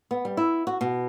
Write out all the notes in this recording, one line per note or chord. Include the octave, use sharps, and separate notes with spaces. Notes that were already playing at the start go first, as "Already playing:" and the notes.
B3
G3
E4
F#4
B2